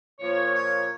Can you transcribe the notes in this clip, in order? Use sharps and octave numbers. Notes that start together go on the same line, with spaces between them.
A#2 F3 A#3 C#5
C#5